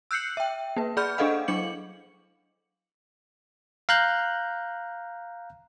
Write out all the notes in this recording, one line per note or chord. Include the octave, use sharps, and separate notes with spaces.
E6 F#6 G6 C7 C#7 F#7
E5 G5
A#3 B4
G#4 D5 B5 F6 G6
D4 G#4 A4 D#5 F5 F#5
F#3 D4 D6 C#7 F#7
F5 A#5 F#6 G6